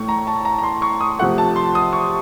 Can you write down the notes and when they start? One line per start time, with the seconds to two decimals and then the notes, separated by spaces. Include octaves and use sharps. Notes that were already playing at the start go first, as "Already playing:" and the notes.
Already playing: A2 A3 C#6
0.08 A#5
0.27 A5
0.45 A#5
0.58 A#5
0.63 C6
0.82 C#6
1.01 D#6
1.19 C3 F3 A3 F#5
1.38 A5
1.56 C6
1.75 D#6
1.93 C#6